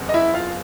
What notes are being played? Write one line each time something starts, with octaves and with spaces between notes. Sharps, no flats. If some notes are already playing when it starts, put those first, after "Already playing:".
Already playing: F#1 E2 C3
D#5
E4 E5
F4 F5